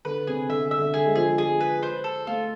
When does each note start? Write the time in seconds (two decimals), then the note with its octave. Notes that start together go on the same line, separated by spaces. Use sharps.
0.05 D3 B4
0.27 C3 G#4
0.49 D3 E5
0.71 E5
0.79 D3
0.94 D3 G#4
1.06 G#3
1.15 F3 G#4
1.38 G#3 G#4
1.60 B4
1.83 C5
2.04 A4
2.27 A3 F4